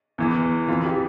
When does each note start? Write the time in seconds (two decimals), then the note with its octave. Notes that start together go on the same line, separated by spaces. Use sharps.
0.18 E2 E3
0.68 E3 F4
0.71 F2
0.86 G4